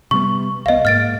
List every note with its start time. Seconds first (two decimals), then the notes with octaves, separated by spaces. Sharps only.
0.11 C3 G3 B3 C#6
0.66 C2 B3 D#5 F5
0.85 G#2 A#3 F6 A6 D7